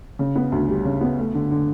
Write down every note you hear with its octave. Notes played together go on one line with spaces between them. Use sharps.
C#3
B3
D2
G3
C#3
B3
A3
D3
D3